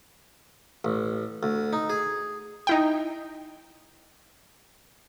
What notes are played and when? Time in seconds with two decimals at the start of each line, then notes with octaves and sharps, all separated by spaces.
0.85 A1
1.43 D2
1.73 D#4
1.90 G#4
2.67 D#4 E4 G5